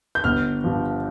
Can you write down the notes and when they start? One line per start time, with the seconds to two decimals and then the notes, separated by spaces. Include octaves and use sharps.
0.15 G6
0.24 G1 F6
0.64 G2 F3